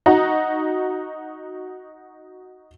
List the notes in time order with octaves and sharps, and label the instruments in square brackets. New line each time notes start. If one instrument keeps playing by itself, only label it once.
[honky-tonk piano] D#4 F#4 F#5 A#5